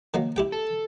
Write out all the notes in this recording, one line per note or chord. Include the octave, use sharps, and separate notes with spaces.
D#3 F#3 A#3
E4 G4 G5
A4